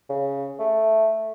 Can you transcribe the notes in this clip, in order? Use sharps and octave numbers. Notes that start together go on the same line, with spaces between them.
C#3
A3